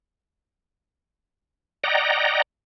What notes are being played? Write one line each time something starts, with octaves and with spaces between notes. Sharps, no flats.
D5 D#5 F#5 G5 A#5